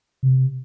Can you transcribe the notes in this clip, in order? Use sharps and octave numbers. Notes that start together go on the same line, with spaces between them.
C3